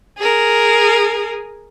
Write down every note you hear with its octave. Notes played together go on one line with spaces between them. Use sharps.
G#4 A#4